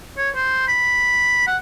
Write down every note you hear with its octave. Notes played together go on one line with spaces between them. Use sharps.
C#5
C5
B5
F#5